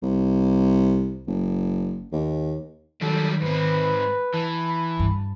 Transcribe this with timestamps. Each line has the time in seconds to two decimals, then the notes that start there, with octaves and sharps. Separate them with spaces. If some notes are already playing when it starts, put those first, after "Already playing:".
0.03 C2
1.27 F#1
2.12 D#2
3.02 D#3 F#3 G3 A4
3.42 G#2 C4 B4
4.34 E3 A5
4.67 B5
4.99 G2